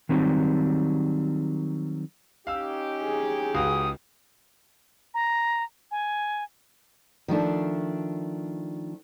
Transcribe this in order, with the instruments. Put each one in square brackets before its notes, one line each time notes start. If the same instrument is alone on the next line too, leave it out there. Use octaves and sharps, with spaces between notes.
[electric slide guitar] D#3 F#3 G3 C4 D#4
[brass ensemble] C#4 D#4 G4 [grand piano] F5 E6
[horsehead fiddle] G#4
[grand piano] C#2 F#4 F5 [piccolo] D#6
[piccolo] A#5
G#5
[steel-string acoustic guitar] D#3 F3 A3 D4